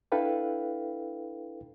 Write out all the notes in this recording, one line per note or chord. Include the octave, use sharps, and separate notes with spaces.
D4 E4 A4 B4 F5 G5